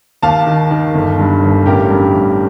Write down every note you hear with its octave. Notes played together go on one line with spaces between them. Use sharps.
D#2 F5 A5
D#3
D#3
G1
G2
G1
A1 G4 A#4
G2
A1